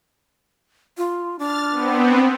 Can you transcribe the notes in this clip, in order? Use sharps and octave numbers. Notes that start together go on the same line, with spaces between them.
F4
D4 F6 A6
B3 C4